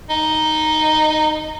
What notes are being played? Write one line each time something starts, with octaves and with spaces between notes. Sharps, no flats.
D#4